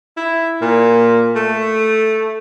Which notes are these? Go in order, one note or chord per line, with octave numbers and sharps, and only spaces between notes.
E4
A#2
A3